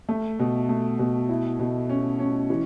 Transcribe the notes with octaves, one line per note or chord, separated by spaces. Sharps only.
A3
B2
A3
B2
E4
B2
C#4
C#4
E3